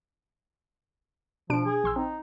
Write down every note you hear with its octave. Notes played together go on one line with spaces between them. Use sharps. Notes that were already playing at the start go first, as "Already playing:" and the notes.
B2 F3 D4 D7
G#4
A#1 C6 E6
C4 D#4